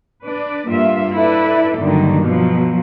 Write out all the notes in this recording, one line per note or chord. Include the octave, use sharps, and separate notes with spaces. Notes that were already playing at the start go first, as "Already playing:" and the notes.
D4 B4 D5
G2 A#3 F4 E5
E4 A4 B4 D5 E5
G2 D3 D#3 F#3 A#3 D4
B2 F3 F#3